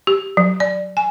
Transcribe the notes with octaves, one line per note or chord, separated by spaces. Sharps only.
G4
F#3
D5
G#5